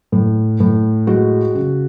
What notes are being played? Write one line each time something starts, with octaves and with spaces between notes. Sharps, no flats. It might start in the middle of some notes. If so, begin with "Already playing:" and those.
A2
A2
G#3 F#4
C#3